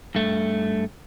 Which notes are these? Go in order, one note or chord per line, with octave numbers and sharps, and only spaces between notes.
G2 A3